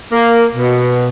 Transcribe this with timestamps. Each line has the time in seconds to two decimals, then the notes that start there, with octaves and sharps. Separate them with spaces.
0.12 A#3
0.55 B2